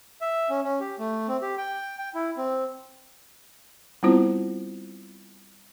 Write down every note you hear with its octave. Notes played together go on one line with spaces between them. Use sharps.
E5
C#4
C#4
G4
A3
C4
G4
G5
G5
E4
C4
G3 B3 C4 E4 F4 C5